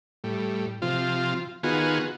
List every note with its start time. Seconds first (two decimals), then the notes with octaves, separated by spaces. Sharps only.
0.24 A2 G3
0.82 C3 F3 F4
1.63 D#3 B3 F4 F#4 G#4